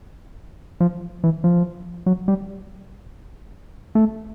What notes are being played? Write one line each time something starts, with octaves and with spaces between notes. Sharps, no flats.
F3
E3
F3
F#3
G3
A3